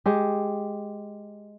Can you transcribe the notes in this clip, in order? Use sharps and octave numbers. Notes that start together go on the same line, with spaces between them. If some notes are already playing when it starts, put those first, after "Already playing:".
G#3 G4